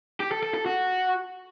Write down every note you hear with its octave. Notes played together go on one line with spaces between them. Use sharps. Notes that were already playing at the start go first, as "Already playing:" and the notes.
G4
A4
A4
A4
F#4